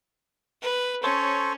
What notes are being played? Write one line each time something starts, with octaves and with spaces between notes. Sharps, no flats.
B4
C#4 A4 C5 C#5